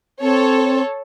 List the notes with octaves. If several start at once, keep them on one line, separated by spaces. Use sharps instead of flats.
C4 A4 C#5